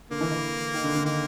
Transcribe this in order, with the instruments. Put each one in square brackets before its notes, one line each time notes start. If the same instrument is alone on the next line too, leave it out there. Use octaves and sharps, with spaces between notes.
[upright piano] D3 [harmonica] A#3
[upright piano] E3
E3
D#3
D3
D3
[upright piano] D#3 [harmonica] A#3